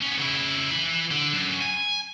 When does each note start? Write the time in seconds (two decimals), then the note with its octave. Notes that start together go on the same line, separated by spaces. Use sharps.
0.01 B3 C#4
0.18 C#3 E4
0.72 E3 B5
1.11 D3
1.33 F#2
1.61 G#5